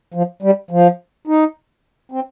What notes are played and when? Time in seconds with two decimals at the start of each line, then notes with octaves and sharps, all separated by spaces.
0.14 F3
0.42 G3
0.71 F3
1.27 D#4
2.12 C4